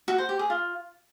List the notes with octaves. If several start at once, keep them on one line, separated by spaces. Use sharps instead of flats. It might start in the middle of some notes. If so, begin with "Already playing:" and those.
F#4
C5
G4
G#4
F4